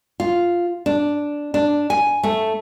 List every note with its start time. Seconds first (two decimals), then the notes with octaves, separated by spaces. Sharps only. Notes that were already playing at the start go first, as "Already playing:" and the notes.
0.20 F4
0.86 D4
1.54 D4
1.90 G#5
2.23 A3